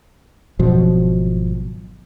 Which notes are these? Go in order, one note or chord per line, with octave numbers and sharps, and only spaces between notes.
G#1 B2 F3 F#3